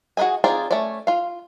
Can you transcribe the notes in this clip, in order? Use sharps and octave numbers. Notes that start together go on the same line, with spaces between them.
F#4 G#4 B4 D#5 G#5
C4 D#4 F4 G#4 D5
A3 C#4 C#5 D5
F4 F5